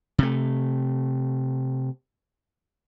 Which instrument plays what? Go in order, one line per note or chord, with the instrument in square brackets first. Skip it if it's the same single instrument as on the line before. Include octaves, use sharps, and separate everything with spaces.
[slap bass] C3 A3